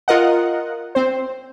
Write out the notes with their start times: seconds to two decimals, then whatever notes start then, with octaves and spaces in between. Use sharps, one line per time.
0.08 F4 A#4 D#5 F#5
0.95 C4 C5